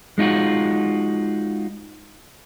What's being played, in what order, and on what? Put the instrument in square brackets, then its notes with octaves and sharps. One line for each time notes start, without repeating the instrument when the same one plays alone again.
[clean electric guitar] G#3 D#4 F4 F#4